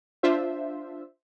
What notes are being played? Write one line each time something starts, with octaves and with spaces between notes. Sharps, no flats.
D4 F4 C5 E5